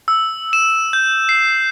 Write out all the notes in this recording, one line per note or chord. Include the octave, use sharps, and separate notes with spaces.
E6
E7
G6
C7